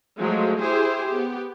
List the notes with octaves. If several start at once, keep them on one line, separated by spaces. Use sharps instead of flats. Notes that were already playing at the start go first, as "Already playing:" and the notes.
F3 F#3 G#3 A3
E4 G4 G#4 C5
B3 G4